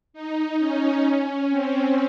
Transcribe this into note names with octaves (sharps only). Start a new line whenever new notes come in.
D#4
C#4
C#4
C4